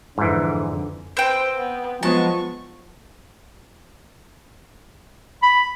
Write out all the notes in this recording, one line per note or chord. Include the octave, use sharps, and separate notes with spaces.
F2 G#2 D3 E3
C4 B4 C5 G5
B3
F3 F#3 G#3 B3 A5 C#6
B5